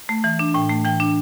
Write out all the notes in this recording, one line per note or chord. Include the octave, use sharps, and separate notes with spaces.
A3
E3
D4
A2 G5
A3
E3 G5
D4